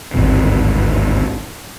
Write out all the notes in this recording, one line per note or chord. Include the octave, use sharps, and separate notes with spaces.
G#1 D2 G2 C3